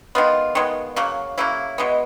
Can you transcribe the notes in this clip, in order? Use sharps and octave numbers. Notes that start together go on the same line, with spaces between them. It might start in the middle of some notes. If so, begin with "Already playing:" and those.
D#3 G#3 B3 F4
D#3 G#3 B3
C#3 F#3 A#3
C#3 F#3 A#3 E4
B2 G#3 B3